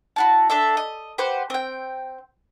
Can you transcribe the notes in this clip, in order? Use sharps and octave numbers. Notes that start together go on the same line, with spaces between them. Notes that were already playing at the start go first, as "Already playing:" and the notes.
E4 F#4 A5
D4 A4 E5
D#5
G4 B4 C5 F#5
C4 G5